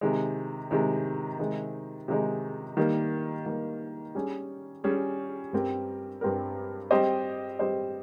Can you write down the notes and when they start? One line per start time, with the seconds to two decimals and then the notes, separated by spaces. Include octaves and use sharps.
0.01 C3 D#3 G#3
0.71 C3 D#3 G#3
1.39 C3 D#3 G#3 D#4
2.08 C3 D#3 G#3 D#4
2.77 D#3 G3 A#3
3.46 D#3 G3 A#3
4.15 G3 C#4 G#4
4.84 G3 C#4 G#4
5.53 G2 G3 C4 G4 A#4
6.21 G2 G3 C4 G4 A#4
6.91 G3 C4 G4 C5 D#5
7.59 G3 C4 G4 C5 D#5